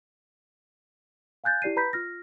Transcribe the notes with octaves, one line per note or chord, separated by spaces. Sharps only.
F5 G#5 F#6 G6 A6
E4 G4 D5 C7 D#7
B4 A#5 B5 G6 B6
F4 F6 A#6